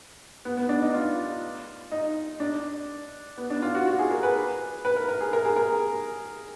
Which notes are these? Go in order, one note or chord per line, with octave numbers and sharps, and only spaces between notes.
B3
B3
D4
D#4
F4
D#4
D4
B3
D4
F4
F#4
F#4
G#4
A#4
B4
B4
A#4
A#4
G#4
A#4
G#4
A#4